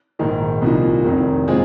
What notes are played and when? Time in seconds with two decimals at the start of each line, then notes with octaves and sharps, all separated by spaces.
0.19 A#1 G#2 D#3 G#3
0.62 C2 A#2 F3 A#3 D#4
1.05 F1 F2 D#3
1.48 A#2 G#3 C4 F4 G#4